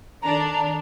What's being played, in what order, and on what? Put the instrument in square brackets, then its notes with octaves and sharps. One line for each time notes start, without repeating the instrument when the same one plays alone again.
[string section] D#3 D4 A4 [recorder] A#5